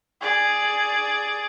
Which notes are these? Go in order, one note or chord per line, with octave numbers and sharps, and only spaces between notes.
G#4 D5